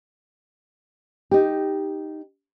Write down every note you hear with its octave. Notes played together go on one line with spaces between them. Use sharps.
D#4 G4